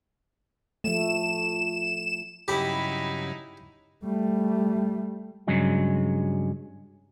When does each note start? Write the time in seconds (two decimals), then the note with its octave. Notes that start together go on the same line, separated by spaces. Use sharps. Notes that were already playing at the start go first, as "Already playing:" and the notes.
0.84 F3 A3 E7
2.48 G2 C#3 F#3 D#4 E4 G4 B5
4.05 G3 A3
5.47 G2 C#3 F#3 G#3